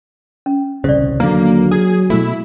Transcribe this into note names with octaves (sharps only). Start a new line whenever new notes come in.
C#4
D#1 C2 C#3 C5 D5
D#2 D3 F#3 A#3
G#4
B2 G#3 A3 E4